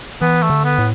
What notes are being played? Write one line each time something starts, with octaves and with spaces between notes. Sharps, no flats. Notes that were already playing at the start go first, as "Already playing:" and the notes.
E3 B3
A3
D3
B3
A2